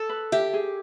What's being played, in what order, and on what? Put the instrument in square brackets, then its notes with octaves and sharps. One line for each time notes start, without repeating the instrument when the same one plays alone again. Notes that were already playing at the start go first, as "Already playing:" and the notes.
Already playing: [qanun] A4
[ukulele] B4
[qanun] G4 [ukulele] E5
[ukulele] G#4